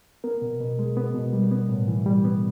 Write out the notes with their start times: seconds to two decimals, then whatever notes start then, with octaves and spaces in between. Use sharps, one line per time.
0.24 B3 A#4
0.42 B2
0.60 B2
0.79 G#3
0.97 B3
1.15 B2
1.33 G3
1.52 B3
1.69 A2
1.88 E3
2.06 G3
2.24 B3